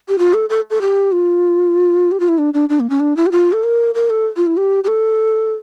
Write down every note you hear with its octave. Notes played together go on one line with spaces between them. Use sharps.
G4
F4
A4
A4
A4
G4
F4
G4
F4
E4
D4
D4
D4
A#3
C#4
D4
E4
G4
F4
A4
A#4
A#4
A4
F4
E4
G4
G4
A4